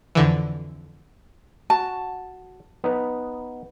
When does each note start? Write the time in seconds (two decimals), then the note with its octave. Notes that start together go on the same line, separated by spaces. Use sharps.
0.15 F2 D3 E3
1.70 F#4 A5
2.84 B3 D#4 B4